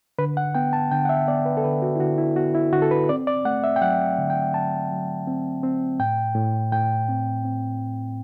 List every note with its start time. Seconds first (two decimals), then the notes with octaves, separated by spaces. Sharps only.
0.18 D3 B4
0.37 F#5
0.55 B3 G5
0.73 A5
0.91 D3 G5
1.05 F#5
1.09 E5
1.28 B3 D5
1.46 B4
1.57 A4
1.64 D3 B4
1.82 F#4
1.96 E4
2.00 D3 F#4
2.18 E4
2.36 B3 F#4
2.55 E4
2.73 D3 F#4
2.82 A4
2.91 B4
3.09 C4 D5
3.27 D5
3.45 A3 F#5
3.64 E5
3.76 G5
3.82 F#3 F#5
4.18 D3
4.30 G5
4.54 F#3 A5
4.91 F#3
5.27 C4
5.63 C4
5.99 A2 G5
6.35 A2
6.72 A2 G5
7.08 C4
7.44 C4